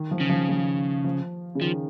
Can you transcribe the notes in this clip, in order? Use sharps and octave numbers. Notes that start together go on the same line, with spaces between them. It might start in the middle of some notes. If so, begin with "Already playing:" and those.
Already playing: D#3
F3
C#3
F3
F3
F3
C#3
D#3 F3